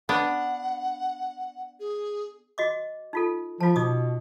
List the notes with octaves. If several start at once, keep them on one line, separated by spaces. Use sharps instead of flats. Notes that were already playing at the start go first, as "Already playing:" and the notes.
B3 D4 F#5
G#4
F#4 D#5 D6
D#4 F4 A4
F3 F4 A5
B2 D#4 D6 D#6